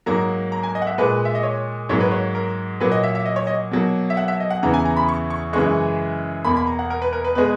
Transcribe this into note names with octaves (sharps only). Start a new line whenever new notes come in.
G#2 F#3 A#3 A#5
A#5
G#5
D#5
F#5
E5
A#2 G#3 B4
E5
D#5
C#5
G#2 F#3 A#3 C#5
B4
C#5
A#4
A#2 F#3 A#3 B4
D#5
E5
E5
D#5
C#5
D#5
B2 F#3 A#3
E5
F#5
E5
D#5
F#5
E2 C#3 E3 A#5
G#5
A#5
B5
C#6
C#6
F#2 C#3 E3 G#3 C#6
E2 B2 A#3 B5
B5
A#5
F#5
A#4
B4
A#4
B4
B2 G#3 B4